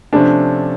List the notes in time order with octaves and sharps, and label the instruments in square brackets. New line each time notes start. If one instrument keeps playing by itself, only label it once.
[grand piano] C3 F3 A3 C#4 [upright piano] D4